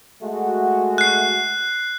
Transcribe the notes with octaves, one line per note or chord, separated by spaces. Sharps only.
G#3 A3 F#4
F#6 C7